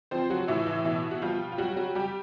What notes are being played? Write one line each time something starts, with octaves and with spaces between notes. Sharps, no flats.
F3 C4 C5
F#3 F#4
A2 E3 E4
E3 E4
B2 E3 E4
F#4
F3 G3 F4
F4
F#3 G3 F#4
F#3 F#4
G3 G4